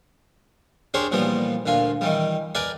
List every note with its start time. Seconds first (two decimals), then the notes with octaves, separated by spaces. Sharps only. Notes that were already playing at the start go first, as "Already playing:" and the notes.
0.94 D4 G4 G#4 A#4 C5 C#5
1.12 A#2 E3 F3 G3 B3
1.66 D2 A#2 F4 G#5
2.01 D#3 E3 G3
2.55 A#4 B4 D5 G5 G#5